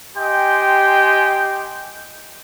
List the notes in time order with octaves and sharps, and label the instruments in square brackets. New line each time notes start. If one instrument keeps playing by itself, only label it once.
[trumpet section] G4 D#5 G5 G#5 C6